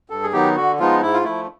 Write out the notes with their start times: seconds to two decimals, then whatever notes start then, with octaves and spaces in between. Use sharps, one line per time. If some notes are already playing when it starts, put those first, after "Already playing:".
0.10 G2 A4
0.23 G#4
0.33 D#3 F#3 B3 D#4 G4
0.56 D3 F#4
0.79 F3 G#3 B3 D#4 F4
1.01 G#2 E4
1.13 F4
1.24 F3 A3 E4